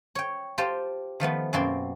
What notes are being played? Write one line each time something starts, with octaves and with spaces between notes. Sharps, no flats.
C#5 G5
F4 G4 C5 D5 G5 A5
D#3 F3 A3 B3
F#2 B2 A#3 C4 D5 C6